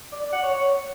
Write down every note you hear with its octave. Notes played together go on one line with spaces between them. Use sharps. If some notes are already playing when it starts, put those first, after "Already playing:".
D5
D5
F#5
C#5
C#5